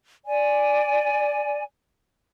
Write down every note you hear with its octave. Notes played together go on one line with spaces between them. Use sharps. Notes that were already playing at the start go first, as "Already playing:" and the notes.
D5 G#5